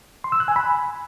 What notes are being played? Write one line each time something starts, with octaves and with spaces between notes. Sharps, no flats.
C6
E6
F#6
G#5
B5